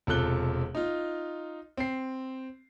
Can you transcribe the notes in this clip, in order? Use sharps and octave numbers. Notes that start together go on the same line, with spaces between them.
E1 C3 F4 A4 F#6 G7
D#4 F4
C4 C7